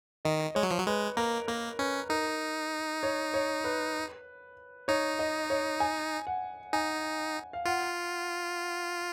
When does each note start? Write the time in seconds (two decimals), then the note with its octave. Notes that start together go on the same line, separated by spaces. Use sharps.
0.25 D#3 D#5
0.55 G#3 C#5
0.63 F#3
0.71 F3
0.78 F#3
0.87 G#3 B4
1.17 A#3 A#4
1.48 A#3 A#4
1.79 C#4 B4
2.09 D#4 A#4
3.03 C#5
3.34 C#5
3.64 B4
4.88 D#4 C#5
5.19 D#5
5.50 C#5
5.80 G#5
6.27 F#5
6.73 D#4 G#5
7.53 F5
7.65 F4 F#5